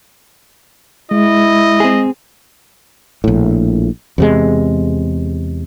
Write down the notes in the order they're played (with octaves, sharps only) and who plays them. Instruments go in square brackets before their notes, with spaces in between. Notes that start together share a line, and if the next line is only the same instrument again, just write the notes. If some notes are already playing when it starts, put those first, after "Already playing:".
[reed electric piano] G#3 [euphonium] E4 [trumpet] D#5
[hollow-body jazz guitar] C4 G#4
[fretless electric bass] A#1 A2
E2 C3 G#3